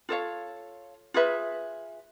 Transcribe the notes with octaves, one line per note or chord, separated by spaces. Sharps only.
F4 A4 C#5 F5
F4 G#4 B4 E5